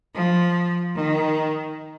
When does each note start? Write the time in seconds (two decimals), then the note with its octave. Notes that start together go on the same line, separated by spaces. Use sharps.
0.15 F3
0.95 D#3